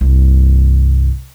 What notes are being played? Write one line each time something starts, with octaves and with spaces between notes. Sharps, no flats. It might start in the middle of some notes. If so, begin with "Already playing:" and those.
C2 G2